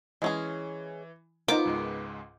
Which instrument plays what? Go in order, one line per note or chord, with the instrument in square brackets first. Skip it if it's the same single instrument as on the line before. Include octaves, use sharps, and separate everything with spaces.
[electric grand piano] E3 [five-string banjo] G#3 C#4 G#4
[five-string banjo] B3 [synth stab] D#4 F4 A#4 [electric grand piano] C5 G6 [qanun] D6
[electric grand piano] C#2 G#2 G#3